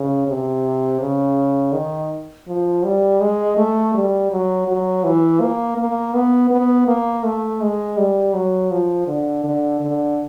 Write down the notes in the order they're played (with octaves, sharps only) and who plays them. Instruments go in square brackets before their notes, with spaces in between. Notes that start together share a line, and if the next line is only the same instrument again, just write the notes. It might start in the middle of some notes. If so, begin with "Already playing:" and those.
Already playing: [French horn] C#3
C3
C#3
D#3
F3
G3
G#3
A3
G3
F#3
F#3
E3
A#3
A#3
B3
B3
A#3
A3
G#3
G3
F#3
F3
D3
D3
D3